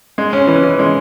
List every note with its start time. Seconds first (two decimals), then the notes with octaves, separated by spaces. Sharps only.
0.18 G#3
0.33 C#4
0.47 E3
0.64 E3
0.79 G#3